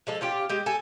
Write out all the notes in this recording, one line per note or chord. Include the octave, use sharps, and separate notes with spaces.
F3 G#3 A4
C#4 F4 G4
G#3 G4
A4 G#5